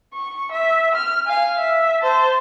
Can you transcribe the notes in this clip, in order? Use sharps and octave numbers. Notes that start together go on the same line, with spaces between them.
C#6
E5
F6
F5 G#5
E5
C5 A5